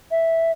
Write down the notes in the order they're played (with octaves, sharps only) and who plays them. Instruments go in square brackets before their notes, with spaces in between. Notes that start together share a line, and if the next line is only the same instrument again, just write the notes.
[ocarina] E5